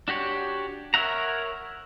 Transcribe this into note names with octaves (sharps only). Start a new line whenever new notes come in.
D4 F#4 G4 C#5
A#4 C#5 E5 F#5 A#5